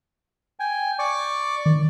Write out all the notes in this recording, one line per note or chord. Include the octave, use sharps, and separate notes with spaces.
G5 G#5
D5 C#6 D6
D#3 D5